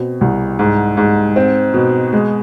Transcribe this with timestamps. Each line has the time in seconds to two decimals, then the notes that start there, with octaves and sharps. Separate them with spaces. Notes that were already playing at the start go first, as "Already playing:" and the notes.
Already playing: B2 C4
0.21 C2
0.59 G#2
0.97 G#2
1.36 C4
1.74 B2
2.13 G#3